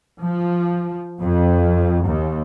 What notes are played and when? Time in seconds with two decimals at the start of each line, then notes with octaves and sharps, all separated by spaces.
0.22 F3
1.20 F2
2.04 D#2